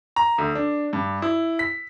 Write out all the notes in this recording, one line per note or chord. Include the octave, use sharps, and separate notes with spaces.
A#5
D2
D4
G2
E4
B6